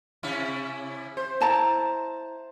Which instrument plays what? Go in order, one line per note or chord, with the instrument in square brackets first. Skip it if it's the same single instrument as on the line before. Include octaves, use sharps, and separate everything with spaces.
[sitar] C3 C#4 E4
C5
[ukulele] E4 A5 A#5